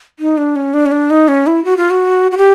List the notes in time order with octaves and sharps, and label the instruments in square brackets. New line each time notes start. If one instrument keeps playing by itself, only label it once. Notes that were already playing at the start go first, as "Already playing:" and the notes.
[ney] D#4
D4
C#4
D4
C#4
D4
D#4
C#4
E4
F#4
F4
F#4
F#4
G4